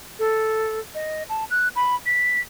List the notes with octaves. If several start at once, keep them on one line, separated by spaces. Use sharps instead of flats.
A4
D#5
A5
F#6
B5
B6